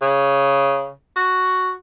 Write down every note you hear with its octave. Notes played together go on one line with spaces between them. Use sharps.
C#3
F#4